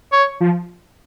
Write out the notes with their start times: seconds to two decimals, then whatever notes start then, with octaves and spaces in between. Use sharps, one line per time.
0.12 C#5
0.40 F3